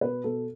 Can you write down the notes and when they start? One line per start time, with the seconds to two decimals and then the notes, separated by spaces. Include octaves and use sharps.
0.01 B2 B4
0.24 B2 A4